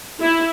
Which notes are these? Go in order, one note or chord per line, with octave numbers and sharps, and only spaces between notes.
E4